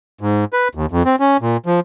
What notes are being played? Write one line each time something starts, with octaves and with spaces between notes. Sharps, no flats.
G#2
B4
D#2
F2
C4
C#4
A#2
F3